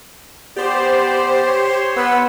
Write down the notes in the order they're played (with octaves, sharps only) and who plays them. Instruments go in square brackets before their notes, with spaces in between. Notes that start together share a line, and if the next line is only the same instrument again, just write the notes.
[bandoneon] B3 D5 [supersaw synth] G4 C5
[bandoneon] C#5 C6
[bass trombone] B3 [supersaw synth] F#5 E6